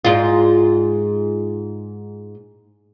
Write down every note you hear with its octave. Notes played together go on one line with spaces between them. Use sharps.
G#2 F4